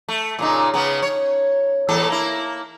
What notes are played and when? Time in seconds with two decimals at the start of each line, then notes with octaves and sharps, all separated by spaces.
0.09 A3
0.39 A#2 C#3 D#4
0.74 C#3 B3
1.02 C#5
1.89 E2 A2 A4
2.08 A#3 E4